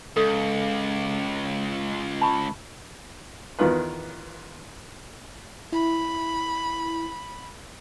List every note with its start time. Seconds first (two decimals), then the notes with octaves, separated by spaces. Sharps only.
0.16 C#2 A4
2.21 A5 B5 C#6
3.59 E2 D#3 B3 F4 B4
5.72 E4 B5